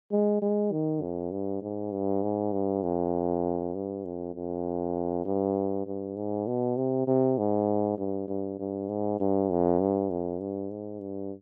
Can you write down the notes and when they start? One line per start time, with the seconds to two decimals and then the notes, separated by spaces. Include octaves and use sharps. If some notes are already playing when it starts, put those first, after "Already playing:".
0.11 G#3
0.42 G#3
0.72 D#3
1.02 F2
1.31 G2
1.62 G#2
1.92 G2
2.23 G#2
2.53 G2
2.83 F2
3.75 G2
4.05 F2
4.35 F2
5.25 G2
5.87 G2
6.16 G#2
6.47 B2
6.77 C3
7.07 C3
7.38 G#2
7.98 G2
8.28 G2
8.59 G2
8.89 G#2
9.20 G2
9.50 F2
9.80 G2
10.10 F2
10.41 G2
10.70 G#2
11.00 G2